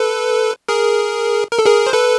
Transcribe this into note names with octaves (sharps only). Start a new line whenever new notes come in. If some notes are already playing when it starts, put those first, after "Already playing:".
Already playing: A4 B4
G#4 A#4
A#4
A4
G#4 A#4
C5
A4 B4